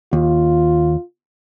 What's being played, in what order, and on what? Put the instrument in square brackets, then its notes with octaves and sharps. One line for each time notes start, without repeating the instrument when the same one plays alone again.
[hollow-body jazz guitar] D#2 [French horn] F4